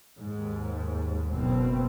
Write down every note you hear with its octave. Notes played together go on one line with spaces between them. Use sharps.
D#2 G#2
F#1 B2 C4